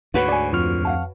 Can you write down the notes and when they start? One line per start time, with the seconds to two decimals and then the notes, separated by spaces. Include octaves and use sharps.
0.14 D2 G#2 F#4 B4 C#5
0.29 D5 G#5
0.53 F2 F4 C#6 F6
0.85 F5 F#5 A5